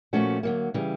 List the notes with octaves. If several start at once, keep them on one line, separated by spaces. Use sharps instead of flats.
A#2 F3 A3 C#4 F#4
D3 F#3 A#3
C#3 E3 G3